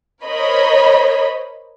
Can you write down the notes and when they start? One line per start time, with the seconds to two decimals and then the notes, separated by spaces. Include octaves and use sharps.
0.25 A#4 C5 C#5 D#5 B5